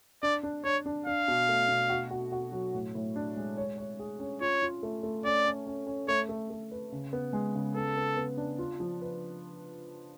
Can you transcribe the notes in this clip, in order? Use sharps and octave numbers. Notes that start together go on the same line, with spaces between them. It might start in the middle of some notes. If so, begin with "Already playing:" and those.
D4 D5
D4
D4 C#5
D4
D4 F5
B2
A3
B2
F#4
F#4
F#4
F#3
A2
A2
D4
G#3
C#5
C#5
G#4
C#4
F4 C#5
F4
A3
A3
C#4 D5
C#4
C#4
C#4
A3 C#5
A3
A3
B4
C#3
B3
G#3
C#3
B3 A4
B3
B3
D4
F4
F3
B4